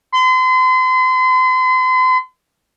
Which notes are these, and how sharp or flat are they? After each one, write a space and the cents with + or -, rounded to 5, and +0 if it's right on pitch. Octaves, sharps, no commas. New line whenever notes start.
C6 -40